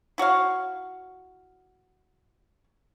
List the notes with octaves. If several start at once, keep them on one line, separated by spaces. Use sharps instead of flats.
E4 F#4 C#5 F5